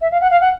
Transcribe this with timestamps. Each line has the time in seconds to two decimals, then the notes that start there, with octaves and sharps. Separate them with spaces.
0.01 E5
0.11 F5
0.21 F#5
0.31 F5
0.41 F#5